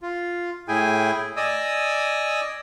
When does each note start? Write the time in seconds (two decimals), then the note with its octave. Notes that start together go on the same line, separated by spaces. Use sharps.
0.03 F4
0.68 A2 E4 G#4 G5 G#5
1.37 D5 D#5 G#5 D#6 E6